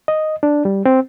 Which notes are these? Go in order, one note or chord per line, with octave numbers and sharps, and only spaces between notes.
D#5
D4
G3
C4